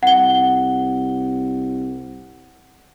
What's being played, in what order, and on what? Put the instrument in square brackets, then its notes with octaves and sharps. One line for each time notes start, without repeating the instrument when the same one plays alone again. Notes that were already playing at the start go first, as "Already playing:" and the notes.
[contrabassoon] C2 [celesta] F#5 G7